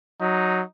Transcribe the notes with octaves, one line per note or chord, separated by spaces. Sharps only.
F#3 D#4